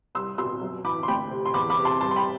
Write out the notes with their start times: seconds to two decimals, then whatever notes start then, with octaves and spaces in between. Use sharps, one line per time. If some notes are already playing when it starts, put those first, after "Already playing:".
0.15 C2 C6 E6
0.38 B2 C6 E6
0.62 F#2
0.84 E3 B5 D6
1.03 C6
1.08 D2 G5 B5
1.31 C3
1.46 C6
1.54 E2 B5 D6
1.70 B5 D6
1.77 C3
1.85 A5 C6
2.01 G3 A5 C6
2.11 C6
2.16 G5 B5